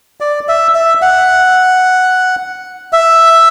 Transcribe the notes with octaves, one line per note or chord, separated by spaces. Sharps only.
D5
E5
E5
F#5
E5